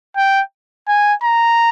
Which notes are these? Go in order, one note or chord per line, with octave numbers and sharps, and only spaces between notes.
G5
G#5
A#5